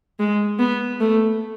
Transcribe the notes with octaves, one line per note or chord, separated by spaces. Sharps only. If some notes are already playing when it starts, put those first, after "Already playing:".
G#3
B3
A3